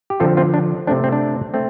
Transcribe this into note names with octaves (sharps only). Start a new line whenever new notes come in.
G4
D3 F3 C4 F4 A4
C4 F4
D4
C3 A3 C4 D4
C4
D4
A3 C4